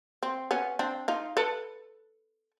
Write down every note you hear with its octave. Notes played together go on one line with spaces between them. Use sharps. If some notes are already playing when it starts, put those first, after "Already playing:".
C4
B3 C#4
C4 D4
D#4 F4
A4 B4